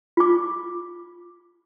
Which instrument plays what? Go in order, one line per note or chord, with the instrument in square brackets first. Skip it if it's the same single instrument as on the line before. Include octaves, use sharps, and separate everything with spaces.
[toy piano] F4 D6